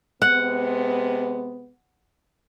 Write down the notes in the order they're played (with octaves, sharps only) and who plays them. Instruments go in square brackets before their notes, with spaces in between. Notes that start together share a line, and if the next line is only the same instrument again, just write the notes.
[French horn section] C3 G#3 B3 [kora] F#5